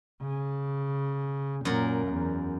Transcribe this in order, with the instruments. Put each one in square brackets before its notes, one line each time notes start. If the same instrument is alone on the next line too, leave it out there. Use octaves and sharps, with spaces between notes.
[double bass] C#3
[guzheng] F#2 A#4 [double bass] A#2
[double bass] E2